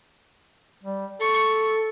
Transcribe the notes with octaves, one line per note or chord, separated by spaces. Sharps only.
G3
A4 C#6